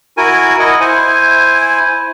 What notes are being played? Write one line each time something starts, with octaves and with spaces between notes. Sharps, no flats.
E4 F#4 A#4 G#5
E4 D#5 F#5
E4 C5 G#5